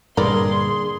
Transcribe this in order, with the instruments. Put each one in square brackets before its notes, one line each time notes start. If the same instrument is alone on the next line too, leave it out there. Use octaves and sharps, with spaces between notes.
[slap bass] G2 A#2 D3 [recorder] G#4 [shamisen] A#4 B4 D5 [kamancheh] C6